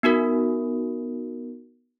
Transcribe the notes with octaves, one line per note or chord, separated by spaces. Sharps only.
B3 D#4 F#4 A#4